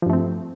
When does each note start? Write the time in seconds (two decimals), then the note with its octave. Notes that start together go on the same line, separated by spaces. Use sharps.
0.02 F3
0.06 G2
0.10 A3
0.13 C4